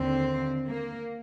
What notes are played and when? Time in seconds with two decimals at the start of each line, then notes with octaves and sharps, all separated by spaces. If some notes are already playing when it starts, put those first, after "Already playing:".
Already playing: D#2 D3 C4
0.68 A#3